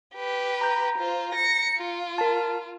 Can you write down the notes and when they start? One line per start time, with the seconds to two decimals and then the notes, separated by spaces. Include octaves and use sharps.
0.15 G4 B4
0.61 A#5 G6
0.98 F4 C5
1.33 A#6 C#7
1.77 F4
2.18 A#4 A5